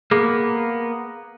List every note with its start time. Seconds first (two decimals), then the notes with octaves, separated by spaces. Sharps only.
0.11 A#3 B3 G#4